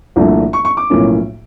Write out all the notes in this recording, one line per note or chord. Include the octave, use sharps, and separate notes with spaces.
C2 A#2 F3 A3 D4
C#6
C#6
D6
B1 A2 F3 A#3 C#4